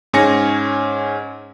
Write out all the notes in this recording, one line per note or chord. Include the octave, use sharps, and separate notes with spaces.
G#2 C#4 G#5 A#6 C#7